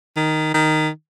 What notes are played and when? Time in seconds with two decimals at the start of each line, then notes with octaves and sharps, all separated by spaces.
0.16 D#3
0.54 D#3